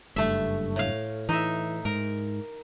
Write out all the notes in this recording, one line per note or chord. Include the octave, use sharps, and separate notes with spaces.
F#1 G2 A3 E5
A2 F5
E3 D#4 E5
G#2 A#4